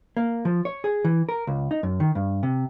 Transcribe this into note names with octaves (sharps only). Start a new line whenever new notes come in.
A#3
F3
C#5
G#4
E3
A#4
C#2
D#4
F#2
D#3
G2
C3